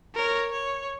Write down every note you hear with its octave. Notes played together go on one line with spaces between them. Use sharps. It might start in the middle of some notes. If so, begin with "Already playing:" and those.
A#4 C#5
C#5